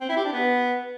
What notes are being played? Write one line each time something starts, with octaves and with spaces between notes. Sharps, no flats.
C4
E4
G4
D4
B3